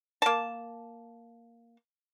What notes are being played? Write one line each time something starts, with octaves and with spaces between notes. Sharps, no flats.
A#3 A5